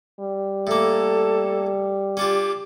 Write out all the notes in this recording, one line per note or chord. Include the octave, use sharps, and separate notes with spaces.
G3
A2 A#3 A4
C#4 D4 F4 G4